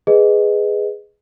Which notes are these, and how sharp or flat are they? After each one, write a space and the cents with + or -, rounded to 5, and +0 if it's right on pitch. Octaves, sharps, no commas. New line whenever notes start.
G#4 +0 B4 +10 D#5 +0